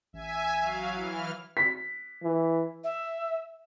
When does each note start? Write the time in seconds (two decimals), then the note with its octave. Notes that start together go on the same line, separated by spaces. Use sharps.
0.13 A1 E5 G#5
0.59 F#3 F5
0.95 E3 F6
1.57 B6
2.23 E3
2.84 E5